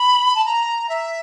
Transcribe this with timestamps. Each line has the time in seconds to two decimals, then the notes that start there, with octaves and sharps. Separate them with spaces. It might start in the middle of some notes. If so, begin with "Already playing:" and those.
Already playing: B5
0.35 A5
0.45 A#5
0.89 E5